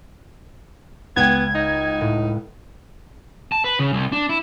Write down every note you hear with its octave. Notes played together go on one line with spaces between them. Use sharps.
C#2 B3 F#5 G5 G#6
D#4 A#5
A2
A5
B4
C#3
C2
D4
E4